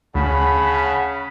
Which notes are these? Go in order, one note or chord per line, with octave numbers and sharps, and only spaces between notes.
D2 C#3 F#5 A5 B5